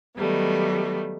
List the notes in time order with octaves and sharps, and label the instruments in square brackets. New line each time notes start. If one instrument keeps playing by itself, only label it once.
[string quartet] D#3 F#3 G3 A3 B3